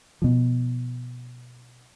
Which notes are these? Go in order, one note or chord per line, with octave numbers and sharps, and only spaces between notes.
B2 F3